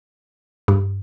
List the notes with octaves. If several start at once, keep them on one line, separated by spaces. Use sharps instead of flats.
G2